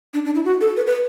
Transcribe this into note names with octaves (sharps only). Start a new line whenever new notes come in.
D4
D4
E4
F#4
A4
B4
B4